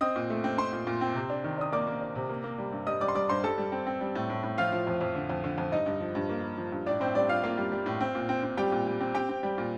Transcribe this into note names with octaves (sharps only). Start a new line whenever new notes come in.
C4 D#5 D#6
A#2
A3
C4
C4 C5 C6
A#2
A#2
C4
C3
D4
D#3
D4 D#6
A#3 D5 D6
A#3
D4
C3
A#3
A#3
G3
G2
G3 D#5 D#6
G3 D5 D6
C6
G3 D5 D6
G2 C5 C6
G3 A4 A5
G3
C4
C4
G3
A2
A2
A2
F3 F4 F5
F3
F2
F2
D3
F2
D3
F2
G2 D#4 D#5
G2
F3
G2
A#3
A#3
F3
G2
A2 D4 D5
A2 C4 C5
G3 D4 D5
D4 F4 F5
A#3 F4 F5
G3
G3
A2
C4
A#2
C4
C4
G3 G4 G5
A#2
G3
C4
C4 G4 G5
C4
G3
A#2